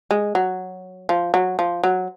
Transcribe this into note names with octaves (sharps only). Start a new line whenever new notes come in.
G#3
F#3
F3
F#3
F3
F#3